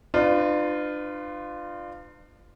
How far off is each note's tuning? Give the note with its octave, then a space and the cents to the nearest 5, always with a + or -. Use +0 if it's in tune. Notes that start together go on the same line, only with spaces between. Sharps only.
D4 +40 F4 +0 B4 +40